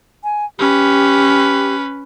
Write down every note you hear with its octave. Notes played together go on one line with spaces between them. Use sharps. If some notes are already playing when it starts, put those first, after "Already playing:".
G#5
C#4 G4 B4